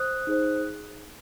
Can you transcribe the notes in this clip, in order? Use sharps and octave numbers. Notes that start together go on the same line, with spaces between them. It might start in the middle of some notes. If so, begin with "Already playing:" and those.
Already playing: C5 D#6 F#6
D#4 G#4 C5